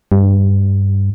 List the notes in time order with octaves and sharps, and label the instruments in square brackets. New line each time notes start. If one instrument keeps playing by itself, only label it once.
[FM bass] G2